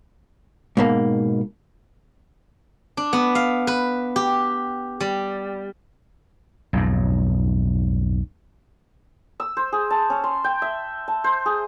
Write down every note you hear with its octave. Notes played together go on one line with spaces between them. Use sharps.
G#2 B2 A#3
D4
B3
F5
B4
G4
G3
B1 F2 G#2
E6
C5
G#4
A5
C#4
C6
G5
E5
A5
C5
G#4